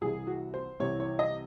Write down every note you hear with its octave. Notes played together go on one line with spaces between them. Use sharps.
C2 C3 E3 G#4
F#4
C5
C2 C3 E3 C#5
C#5
D#5